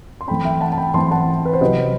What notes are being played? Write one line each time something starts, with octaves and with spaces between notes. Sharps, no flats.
C6
E3 A3 C4 G5 B5
E5 G5
F#5 A5
A5
G5 B5
E3 A3 C4 A5 C6
F#5 A5
B4
C5
C3 F#3 C4 B4 D#5